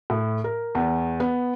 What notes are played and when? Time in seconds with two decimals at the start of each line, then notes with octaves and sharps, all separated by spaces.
0.10 A2
0.44 A#4
0.75 E2
1.20 B3